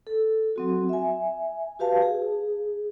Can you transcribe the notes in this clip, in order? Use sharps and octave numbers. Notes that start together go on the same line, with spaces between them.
A4
F#3 C4 F#4
E5 G#5
F#4 G4 B4 F5 A5
G#4